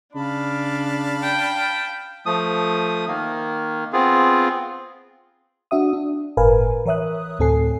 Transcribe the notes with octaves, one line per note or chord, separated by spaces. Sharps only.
C#3 D4 F5 A5 B5
G5
F3 A3 D#6
D#3 A#3
B3 C4 F4 G#4
D4 F#4 E5 D#6
D4
G1 A2 A#4 B4 F5 G#5
E3 A#4 C#5 E5 D#6 F#6
D2 A2 C4 A4 G#5 C7